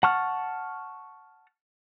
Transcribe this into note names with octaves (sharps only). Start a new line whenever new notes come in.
F#5 A5 C#6 F6